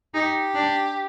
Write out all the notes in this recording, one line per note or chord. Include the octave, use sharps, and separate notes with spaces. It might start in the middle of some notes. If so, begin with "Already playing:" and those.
D#4 G4
D4